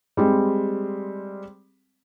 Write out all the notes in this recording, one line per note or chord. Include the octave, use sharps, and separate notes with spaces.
G3 G#3 C4